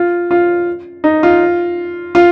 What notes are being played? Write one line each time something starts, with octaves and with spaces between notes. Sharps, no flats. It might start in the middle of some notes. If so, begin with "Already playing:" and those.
Already playing: F4
F4
D#4
F4
F4